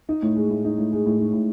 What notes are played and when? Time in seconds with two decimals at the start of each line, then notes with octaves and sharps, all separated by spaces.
0.09 D#4
0.22 A2
0.36 G#3
0.50 A2
0.64 D#4
0.78 A2
0.92 G#3
1.06 A2
1.19 D#4
1.33 A2